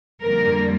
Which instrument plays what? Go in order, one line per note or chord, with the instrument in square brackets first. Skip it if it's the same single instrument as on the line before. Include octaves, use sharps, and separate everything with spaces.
[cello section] F2 D3 G3 A#3 A#4